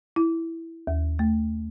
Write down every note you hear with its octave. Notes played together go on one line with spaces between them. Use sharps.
E4
D#2
A3